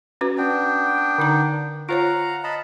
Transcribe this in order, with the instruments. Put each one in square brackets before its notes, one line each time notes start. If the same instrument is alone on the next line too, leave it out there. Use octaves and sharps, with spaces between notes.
[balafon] C#4 F#4 B4
[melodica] B3 D4 G5
[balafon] D3 D#4 A#5
[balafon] F4 C5 C#5 [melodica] F5 F#5 A#5
[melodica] D#5 A5 B5